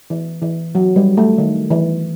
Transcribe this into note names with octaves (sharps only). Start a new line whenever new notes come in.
E3
E3
F#3
G3
A3
D#3
E3